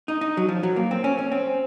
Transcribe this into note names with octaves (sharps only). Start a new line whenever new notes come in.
D#4
D#4
F#3
F3
F#3
A#3
C4
C#4
C#4
C4